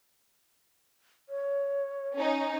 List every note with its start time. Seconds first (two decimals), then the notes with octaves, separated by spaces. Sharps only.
1.29 C#5
2.16 C#4 D#4